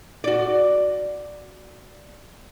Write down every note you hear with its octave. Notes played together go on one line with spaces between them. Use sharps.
F#4 D5